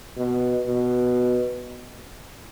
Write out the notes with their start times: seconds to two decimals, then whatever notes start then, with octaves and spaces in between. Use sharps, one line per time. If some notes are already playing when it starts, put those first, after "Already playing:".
0.17 B2
0.67 B2